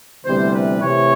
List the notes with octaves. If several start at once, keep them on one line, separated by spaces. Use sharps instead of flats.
D2 C3 E3 G3 B3 C5
B4
C3 E3 A3 C4 C#5